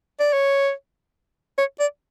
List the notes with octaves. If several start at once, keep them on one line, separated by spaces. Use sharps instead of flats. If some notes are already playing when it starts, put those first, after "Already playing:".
D5
C#5
C#5
D5